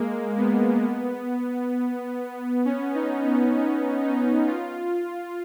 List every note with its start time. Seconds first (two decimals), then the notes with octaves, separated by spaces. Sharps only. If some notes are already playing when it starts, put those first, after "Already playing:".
Already playing: G#3 A#3
0.38 B3
2.65 C#4
2.95 D#4
3.26 B3
3.57 C#4
4.03 D#4
4.47 F4